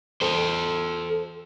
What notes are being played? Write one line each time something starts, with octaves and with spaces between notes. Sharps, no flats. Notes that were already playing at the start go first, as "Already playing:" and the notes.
A4 C5